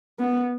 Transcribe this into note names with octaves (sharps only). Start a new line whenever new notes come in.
B3